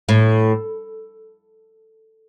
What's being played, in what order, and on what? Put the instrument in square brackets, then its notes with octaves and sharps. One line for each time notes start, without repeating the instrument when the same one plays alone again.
[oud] A2